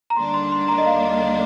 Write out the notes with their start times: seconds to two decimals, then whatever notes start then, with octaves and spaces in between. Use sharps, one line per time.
0.10 A#5
0.16 D#2 D3 G3 A#3 D4 C6
0.34 C6
0.52 C6
0.68 A#5
0.78 D#5
0.86 F5
1.10 D#5